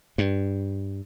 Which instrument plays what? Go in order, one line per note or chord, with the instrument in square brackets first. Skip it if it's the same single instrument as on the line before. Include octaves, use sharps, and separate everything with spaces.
[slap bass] G2